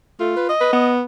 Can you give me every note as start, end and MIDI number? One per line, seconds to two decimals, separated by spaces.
0.20 0.34 57
0.20 0.50 65
0.37 0.48 71
0.49 0.92 75
0.60 0.72 71
0.73 1.02 59